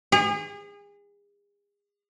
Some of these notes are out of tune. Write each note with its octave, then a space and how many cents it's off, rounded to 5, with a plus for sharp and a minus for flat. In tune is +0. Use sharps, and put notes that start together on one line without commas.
G#4 -35